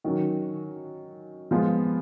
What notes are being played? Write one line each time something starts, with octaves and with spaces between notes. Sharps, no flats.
D#3 F#3 C#4 F#4
F3 G#3 B3 F4